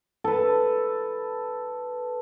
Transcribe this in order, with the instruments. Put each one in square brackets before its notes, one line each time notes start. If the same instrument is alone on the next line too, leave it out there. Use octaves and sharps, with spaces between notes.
[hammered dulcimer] A4 B4